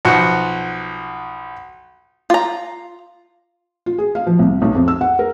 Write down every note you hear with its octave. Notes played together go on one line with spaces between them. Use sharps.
B1 F3 F#4 F#5
F4 A#5
F4
G#4
F5
F3
C2
B1
F2
E6
F#5
A#4